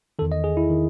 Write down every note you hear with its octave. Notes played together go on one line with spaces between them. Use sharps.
E2 D#3 A4
D#5
G#4
E4
D#3